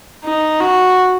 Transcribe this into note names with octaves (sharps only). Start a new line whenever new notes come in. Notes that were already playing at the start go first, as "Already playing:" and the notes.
D#4
F#4